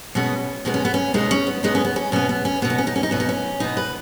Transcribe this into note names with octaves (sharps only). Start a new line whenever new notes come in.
B2 G#3 B3 C#4
B2 G#3 B3 D#4
C#4
B3
C#4
B2 G#3 B3 D#4
C#4
B3
B2 G#3 B3 D#4
C#4
B3
C#4
B2 B3 C#4
B3
C#4
B2 B3 C#4
D#4
C#4
D#4
C#4
D#4
B2 B3 C#4
D#4
C#4
B2 B3 D#4
B4